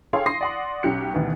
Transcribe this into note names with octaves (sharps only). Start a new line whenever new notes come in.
G#4 A4 C#5 F5 G5 C6
C6 D#6 A#6 C7
D5 F#5 C6
B1 C#4 G4 F#6 C#7
D2 B2 D#3 E3 B3